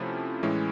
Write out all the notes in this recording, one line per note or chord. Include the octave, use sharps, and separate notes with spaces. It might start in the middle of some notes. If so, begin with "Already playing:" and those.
Already playing: C3 F3 A3 C#4 E4
A2 E3 G#3 C#4 E4